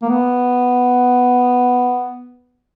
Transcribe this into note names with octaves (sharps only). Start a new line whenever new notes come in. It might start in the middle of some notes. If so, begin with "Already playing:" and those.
A#3
B3